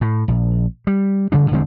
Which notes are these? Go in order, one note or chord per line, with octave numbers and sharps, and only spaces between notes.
A2
A#1
G3
A1 C#3 G3 D4
E1 D3 G#3 C4